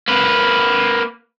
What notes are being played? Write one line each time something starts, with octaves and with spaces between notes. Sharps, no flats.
A#3 B4